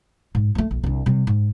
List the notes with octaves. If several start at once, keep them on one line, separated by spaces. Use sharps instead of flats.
G#2
A3 A#3
A#1
C2 D4
C3 G3
G#2